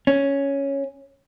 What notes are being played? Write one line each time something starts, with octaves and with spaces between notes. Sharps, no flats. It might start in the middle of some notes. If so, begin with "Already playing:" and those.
C#4